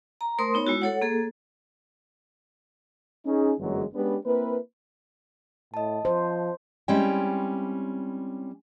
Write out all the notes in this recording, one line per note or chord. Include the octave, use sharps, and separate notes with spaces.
A#5
A3 A#4 C5 C6 D#6
B3 D#4 C#5
G#3 E4 F#4
A4 C#5 F#5
A#3 G#4 A4
C#4 D#4 G#4
G1 F#2 E3 F#3 G#3
G#3 B3 C#4 D4 G4 B4
A#3 C4 E4 A#4 B4
A2 D#5 A5
F3 C5
G3 G#3 C4 C#4 E4 G5